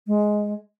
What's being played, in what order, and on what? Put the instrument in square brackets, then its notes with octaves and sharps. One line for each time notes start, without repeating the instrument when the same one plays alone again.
[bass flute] G#3